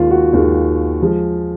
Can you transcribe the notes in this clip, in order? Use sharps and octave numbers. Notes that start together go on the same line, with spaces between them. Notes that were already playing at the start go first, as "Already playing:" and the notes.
Already playing: D#2 D#3 G#3 F4
F#4
D#2 D#3 G#3
F3 G#3